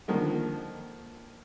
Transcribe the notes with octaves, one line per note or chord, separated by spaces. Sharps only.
D3 D#3 F3 A#3